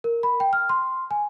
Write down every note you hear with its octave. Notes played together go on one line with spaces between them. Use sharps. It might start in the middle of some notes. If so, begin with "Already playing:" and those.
A#4
B5
G5
F6
C6
G#5